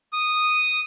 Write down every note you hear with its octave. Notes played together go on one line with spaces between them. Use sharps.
D#6